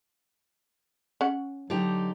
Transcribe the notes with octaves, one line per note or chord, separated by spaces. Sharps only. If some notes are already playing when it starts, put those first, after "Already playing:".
C#4 F#5
D3 F#3 D#4 G4